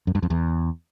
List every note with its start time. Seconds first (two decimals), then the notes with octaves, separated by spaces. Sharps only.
0.07 F#2
0.15 G2
0.23 F2
0.30 E2